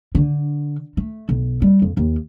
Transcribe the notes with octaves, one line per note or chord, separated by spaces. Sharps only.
D3
A3
B1
G3
F2
D#2